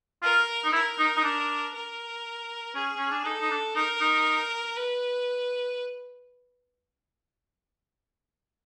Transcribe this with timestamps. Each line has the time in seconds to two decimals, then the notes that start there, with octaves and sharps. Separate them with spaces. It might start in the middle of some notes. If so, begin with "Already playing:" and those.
0.23 F4 A#4
0.65 D#4
0.73 E4 A#4
0.99 D#4
1.17 D#4
1.24 D4
1.74 A#4
2.75 C#4 G#4
2.98 C#4
3.12 D4
3.25 D#4 A4
3.41 D#4
3.51 D4
3.76 D#4 A#4
4.01 D#4
4.77 B4